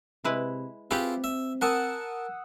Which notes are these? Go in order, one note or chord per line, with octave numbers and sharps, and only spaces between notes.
C3 G#3 E4 B4
C4 E4 F4 G4 G#4 B4
E5
A#4 F#5 G#5 A5 D#6 E6